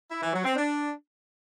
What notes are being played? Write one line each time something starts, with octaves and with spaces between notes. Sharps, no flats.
E4
E3
F#3
C4
D4